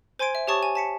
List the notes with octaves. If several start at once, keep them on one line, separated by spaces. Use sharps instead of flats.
C5 G#5 C6 G#6 D7
E5
G4 C#5 A5 C#6 D#6 A6
G#5
A5 B6 C#7